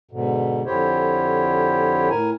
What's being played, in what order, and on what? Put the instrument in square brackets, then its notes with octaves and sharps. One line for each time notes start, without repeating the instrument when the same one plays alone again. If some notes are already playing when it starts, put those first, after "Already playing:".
[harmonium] G#2 B2 D3
F2 D3 E4 G4 C5 C#5
A2 A#4 G#5